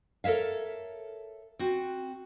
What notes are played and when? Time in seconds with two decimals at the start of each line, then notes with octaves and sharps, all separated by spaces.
0.24 A4 A#4 C#5 E5 F5
1.59 C4 F#4